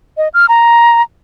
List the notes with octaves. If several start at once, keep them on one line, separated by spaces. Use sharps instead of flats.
D#5
F6
A#5